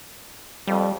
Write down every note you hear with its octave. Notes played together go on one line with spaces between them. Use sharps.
F2 G3